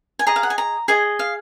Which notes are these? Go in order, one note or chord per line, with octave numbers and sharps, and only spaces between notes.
G#5
G#4 D#5 A#5
F5
F#5
G#5
A#5
G#4 D#5 G#5
F5